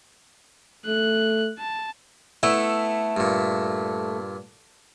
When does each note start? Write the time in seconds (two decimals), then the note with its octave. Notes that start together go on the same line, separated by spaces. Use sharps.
0.86 A3 F#6
1.59 A5
2.43 A3 B3 E4
3.17 G2 A#2